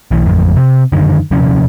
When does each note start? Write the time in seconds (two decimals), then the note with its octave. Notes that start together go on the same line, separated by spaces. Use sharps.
0.11 B1 E3
0.26 A1 F2 A2
0.56 C3
0.92 F#2 D3 D#3
1.31 D#1 C3 F3 C#4